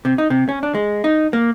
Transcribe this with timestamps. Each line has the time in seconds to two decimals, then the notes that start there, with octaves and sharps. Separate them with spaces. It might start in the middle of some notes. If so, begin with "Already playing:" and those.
0.05 C3
0.18 D#4
0.30 C3
0.49 C#4
0.63 D4
0.75 G#3
1.04 D#4
1.33 A#3